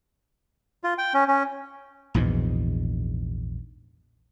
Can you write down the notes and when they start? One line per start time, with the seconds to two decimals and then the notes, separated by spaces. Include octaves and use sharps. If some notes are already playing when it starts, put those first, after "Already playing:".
0.84 F4
0.98 G5
1.14 C#4
1.28 C#4
2.14 A#1 E2 G#2 B2